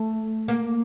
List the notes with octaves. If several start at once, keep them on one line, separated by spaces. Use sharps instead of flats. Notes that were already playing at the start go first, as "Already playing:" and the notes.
Already playing: A3
A#3